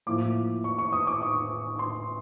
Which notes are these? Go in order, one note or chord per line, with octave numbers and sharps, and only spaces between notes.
A2 F3 A#3 D6
C#6
C#6
D#6
D6
C#6
C6